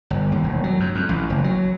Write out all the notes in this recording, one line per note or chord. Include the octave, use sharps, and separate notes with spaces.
G1
D#2
E1
F#3
F#2
F2
A1
F#1
F#3